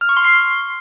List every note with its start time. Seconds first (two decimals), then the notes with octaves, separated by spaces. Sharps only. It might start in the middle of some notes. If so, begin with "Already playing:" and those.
0.01 F6
0.09 C#6
0.17 C6
0.24 C7